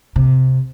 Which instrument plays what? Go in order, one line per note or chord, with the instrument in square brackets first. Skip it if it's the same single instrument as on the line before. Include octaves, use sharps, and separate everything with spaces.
[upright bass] C3